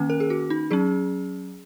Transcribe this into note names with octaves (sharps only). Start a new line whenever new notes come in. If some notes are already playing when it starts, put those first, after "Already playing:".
Already playing: D#3 A#3 C#4
A#4
G#4
F#4
D#4
F#3 C#4 G#4